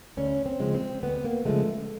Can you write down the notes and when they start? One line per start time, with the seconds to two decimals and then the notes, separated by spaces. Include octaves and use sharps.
0.17 D2 C#4
0.46 C4
0.60 C#3 F3 G#3
0.74 C4
1.03 D2 B3
1.24 A#3
1.45 C#3 F3 G#3 A3